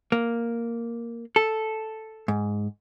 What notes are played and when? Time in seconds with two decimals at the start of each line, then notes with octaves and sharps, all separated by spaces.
0.12 A#3
1.36 A4
2.28 G#2